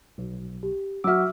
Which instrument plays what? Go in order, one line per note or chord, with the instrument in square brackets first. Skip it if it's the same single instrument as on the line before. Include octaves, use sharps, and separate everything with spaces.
[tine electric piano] B1
[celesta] G4
[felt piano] F#3 F#4 [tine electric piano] E5 D6 [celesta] E6 F6